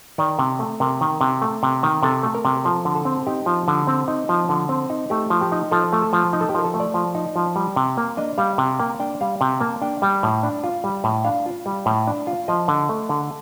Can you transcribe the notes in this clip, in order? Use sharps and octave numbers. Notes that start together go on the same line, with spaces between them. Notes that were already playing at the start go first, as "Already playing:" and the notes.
D#3 D5
C3
A3
C3 A#4
D#3
C3
A3
C3
D#3
C3 A4
A3
A#4
C3
F3 A4
D3
A4
C4
D#4 G4
F3
D3
C4
D#4
F3
D3
C4
D#4
A3 G4
F3
G4
D#4
F3 A4
A3
A4
F3
D#4
A4
G4
F3 A#4
A4
A3
D5
F3
D#4
F3
G3
C3
A#3
D4 D#5
G3 F5
C3
A#3 G5
D4 G5
G3 F5
C3 G5
A#3 A5
D4 G5
G3 G5
A2
D4
F4
G3
A2
D4 F5
F4
G3
A2
D4
F4
F3 D#5
D3
A3
D3